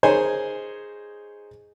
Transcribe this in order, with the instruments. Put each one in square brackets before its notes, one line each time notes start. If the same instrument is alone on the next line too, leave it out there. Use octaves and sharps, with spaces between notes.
[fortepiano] D#4 G#4 A#4 C5 C#5 G#5